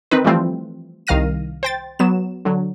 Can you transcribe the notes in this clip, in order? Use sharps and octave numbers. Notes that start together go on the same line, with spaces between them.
D#3 C4 D#4 B4
E3 F3 G3 A3 C4 F4
C2 D#3 F5 F6 A#6 D#7
C5 G5 A6
F#3 B3 E7
D3 F#3